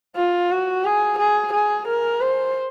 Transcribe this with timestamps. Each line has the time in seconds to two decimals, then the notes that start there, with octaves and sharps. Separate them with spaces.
0.16 F4
0.51 F#4
0.85 G#4
1.19 G#4
1.53 G#4
1.88 A#4
2.21 C5